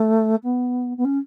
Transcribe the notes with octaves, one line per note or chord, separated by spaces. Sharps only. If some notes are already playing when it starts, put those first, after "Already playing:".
Already playing: A3
B3
B3
C#4